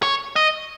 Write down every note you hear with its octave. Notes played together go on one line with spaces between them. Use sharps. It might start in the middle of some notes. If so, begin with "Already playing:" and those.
C#5
D#5